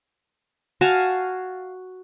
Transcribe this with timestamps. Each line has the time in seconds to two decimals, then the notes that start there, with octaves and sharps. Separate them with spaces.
0.81 F#4 F5 G#5 A5